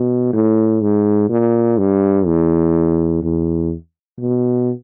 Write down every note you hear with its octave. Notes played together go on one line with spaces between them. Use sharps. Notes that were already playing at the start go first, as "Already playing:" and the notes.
Already playing: B2
A2
G#2
A#2
G2
E2
E2
B2